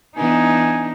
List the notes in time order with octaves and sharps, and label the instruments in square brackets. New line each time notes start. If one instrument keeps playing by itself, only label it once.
[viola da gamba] E3 B3 D4 [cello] D#4 [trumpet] G#5